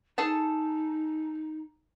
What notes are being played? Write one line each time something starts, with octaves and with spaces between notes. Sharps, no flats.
D#4 G#4 A4 A5